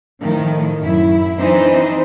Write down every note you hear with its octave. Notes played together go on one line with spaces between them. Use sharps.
A2 D#3 F3
F#2 E4
E3 C4 D4 D#4 C5